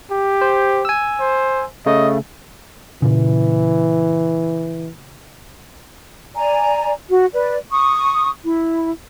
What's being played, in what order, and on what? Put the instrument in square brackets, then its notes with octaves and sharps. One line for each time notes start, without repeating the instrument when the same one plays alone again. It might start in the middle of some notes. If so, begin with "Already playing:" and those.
[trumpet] G4
[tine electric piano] C5
G#5 E6
[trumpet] C5
[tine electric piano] C#3 A3 [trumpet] D#5
[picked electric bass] A#2 C#3 [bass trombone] E3
[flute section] D5 G#5 A#5
F#4
B4 D5
C#6 D#6
E4